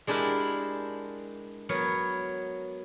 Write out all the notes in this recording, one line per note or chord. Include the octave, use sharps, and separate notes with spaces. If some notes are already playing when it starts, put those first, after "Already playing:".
G#3 D4 E4 G4 A#4
F#3 B3 A#4 C#5